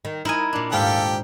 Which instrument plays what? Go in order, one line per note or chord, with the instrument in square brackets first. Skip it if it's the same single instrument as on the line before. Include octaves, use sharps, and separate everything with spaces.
[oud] D#3
[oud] D#4 [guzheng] E4 A#4 G#5
[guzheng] A#2 D4
[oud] D#2 G#2 F5 [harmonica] G4 A4 G5